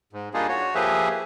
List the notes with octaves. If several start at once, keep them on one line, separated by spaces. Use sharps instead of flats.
G#2
G3 A#3 D4 D#4 F4 G#4
F#4 C#5
F3 A#3 G4 G#4 B4 E5